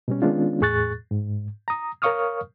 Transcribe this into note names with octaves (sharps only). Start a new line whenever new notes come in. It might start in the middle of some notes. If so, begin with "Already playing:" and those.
B2 G3 C#4
D#3 G#3 B3 C#4 D4 F4
E2 A2 G#4 C#6 F#6 A6
G#2
A#5 D#6
A#4 C#5 F5 C#6 D#6 F6